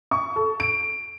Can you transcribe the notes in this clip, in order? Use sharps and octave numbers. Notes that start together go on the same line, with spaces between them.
C#6
A4
D7